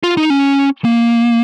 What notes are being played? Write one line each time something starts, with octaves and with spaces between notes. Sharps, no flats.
F4
D#4
C#4
A#3